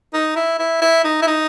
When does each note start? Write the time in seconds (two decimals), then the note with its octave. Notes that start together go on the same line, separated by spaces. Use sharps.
0.14 D#4
0.36 E4
0.59 E4
0.82 E4
1.04 D#4
1.22 E4
1.27 D#4